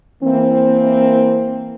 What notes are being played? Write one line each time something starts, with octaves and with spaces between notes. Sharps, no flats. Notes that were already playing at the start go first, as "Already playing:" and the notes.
E3 A#3 C4